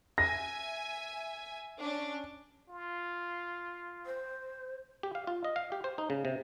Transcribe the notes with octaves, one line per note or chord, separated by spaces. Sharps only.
E5 G#5 A#6
C#4 D4
F4
C5
G4
F5
F4
D#5
F5
G4
C5
D#4
C#3
C3